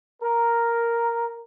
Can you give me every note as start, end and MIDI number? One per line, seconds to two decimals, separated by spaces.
0.23 1.40 70